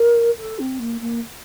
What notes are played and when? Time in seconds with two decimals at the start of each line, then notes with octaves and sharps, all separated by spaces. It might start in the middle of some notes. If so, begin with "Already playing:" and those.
Already playing: A#4
0.37 A4
0.59 C4
0.79 A#3
1.00 A#3